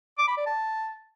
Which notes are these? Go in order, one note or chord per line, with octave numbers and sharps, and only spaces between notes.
D6
B5
D5
A5